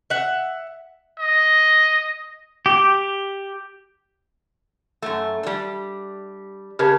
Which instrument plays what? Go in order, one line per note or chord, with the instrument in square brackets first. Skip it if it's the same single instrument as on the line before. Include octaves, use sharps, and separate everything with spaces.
[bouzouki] E5 F#5
[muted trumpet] D#5
[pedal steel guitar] G4
[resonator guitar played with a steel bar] F#2 A3
G3 D4
[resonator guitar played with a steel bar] C#3 [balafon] G4 A#4 A5